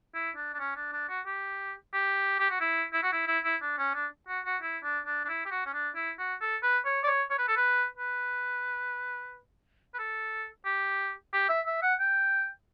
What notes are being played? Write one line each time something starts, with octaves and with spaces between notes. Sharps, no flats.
E4
D4
D4
C#4
D4
D4
F#4
G4
G4
G4
F#4
E4
E4
F#4
E4
E4
E4
D4
C#4
D4
F#4
F#4
E4
D4
D4
D4
E4
G4
F#4
C#4
D4
E4
F#4
A4
B4
C#5
D5
C#5
C#5
B4
A4
B4
B4
B4
A4
G4
G4
E5
E5
F#5
G5